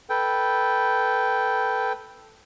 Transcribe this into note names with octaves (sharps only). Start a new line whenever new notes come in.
A4 B4 G5